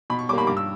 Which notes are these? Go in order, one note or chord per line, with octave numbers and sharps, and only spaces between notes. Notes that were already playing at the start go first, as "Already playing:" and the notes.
B2 B5
C#6
G3 A#3 B5 D6
G2 D6
E6